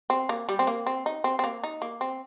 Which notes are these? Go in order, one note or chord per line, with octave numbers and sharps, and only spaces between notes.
C4
A#3
G3
C4
A#3
C4
D#4
C4
C4
A#3
D#4
A#3
C4